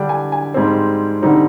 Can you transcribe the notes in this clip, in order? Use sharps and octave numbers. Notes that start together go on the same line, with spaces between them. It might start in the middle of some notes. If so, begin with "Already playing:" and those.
Already playing: D3 G3 D4 G5
G#5
G#5
G#2 G3 C4
D3 G3 C4 D#4